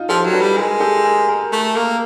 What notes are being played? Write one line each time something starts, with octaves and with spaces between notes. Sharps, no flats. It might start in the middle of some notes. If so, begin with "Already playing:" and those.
Already playing: D#4 F4
F3 G4 A4
F#3
A4 B4
G3
G#3 G#4 A#4
G4 A4
G#4 A#4
G#4 A#4
A3
A#3